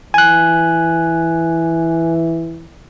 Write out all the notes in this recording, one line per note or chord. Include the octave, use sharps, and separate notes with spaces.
E3 G#5 F#6